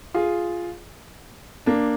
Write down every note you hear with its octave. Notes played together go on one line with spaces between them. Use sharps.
F4 G#4
A#3 D4